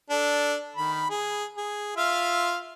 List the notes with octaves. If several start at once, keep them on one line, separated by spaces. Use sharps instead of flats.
D4 A4
D#3 B5
G#4
G#4
F4 E5 F5